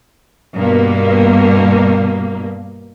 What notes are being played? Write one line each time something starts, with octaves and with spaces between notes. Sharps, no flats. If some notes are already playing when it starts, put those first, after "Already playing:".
G2 B2 A#3